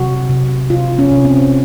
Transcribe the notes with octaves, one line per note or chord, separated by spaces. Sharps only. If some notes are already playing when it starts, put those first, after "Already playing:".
Already playing: C3 F#3 F#4
C3
C3 F4
C#4
C3
C4